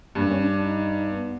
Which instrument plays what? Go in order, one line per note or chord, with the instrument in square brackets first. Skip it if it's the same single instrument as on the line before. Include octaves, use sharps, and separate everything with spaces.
[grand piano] G2 [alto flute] A#3
[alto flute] C#4
D4
D#4
B3